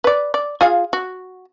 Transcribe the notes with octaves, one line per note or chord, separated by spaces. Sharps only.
B4 D5
D5
F4 G#4 F5
F#4